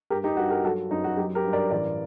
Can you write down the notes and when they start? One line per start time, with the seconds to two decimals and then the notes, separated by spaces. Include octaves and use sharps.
0.10 G2 G4 A#4
0.24 D#4 G4
0.37 G2 F#4
0.50 G4 A#4
0.64 F#3 F#4 A4
0.91 F#2 D#4
1.04 F#4
1.17 F#3 D#4 G4
1.35 G4 A#4
1.45 G2
1.53 A#4 D5
1.71 A1 A#4 D5